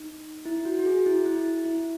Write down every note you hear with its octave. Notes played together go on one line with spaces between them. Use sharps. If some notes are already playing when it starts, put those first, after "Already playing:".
Already playing: D#4
E4
F#4
F#4
G#4
E4
E4
E4